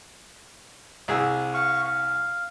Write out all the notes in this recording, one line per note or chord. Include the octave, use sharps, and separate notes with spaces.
C2 G#4 E6
F5 C#6
F5